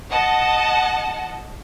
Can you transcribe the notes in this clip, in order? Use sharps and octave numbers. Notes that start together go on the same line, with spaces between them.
D#5 F#5 A5